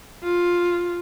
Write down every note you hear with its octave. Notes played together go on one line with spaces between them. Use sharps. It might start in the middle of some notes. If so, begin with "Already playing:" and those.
F4